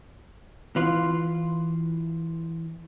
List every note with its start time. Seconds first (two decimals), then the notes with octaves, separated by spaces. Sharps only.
0.76 E3 F4